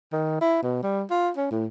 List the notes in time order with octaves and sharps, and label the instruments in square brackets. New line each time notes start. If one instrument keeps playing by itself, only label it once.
[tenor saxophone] D#3
E4
B2
G3
F4
C#4
A2